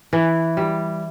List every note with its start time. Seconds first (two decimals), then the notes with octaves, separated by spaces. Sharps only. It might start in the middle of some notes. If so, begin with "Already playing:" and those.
0.13 E3
0.57 G3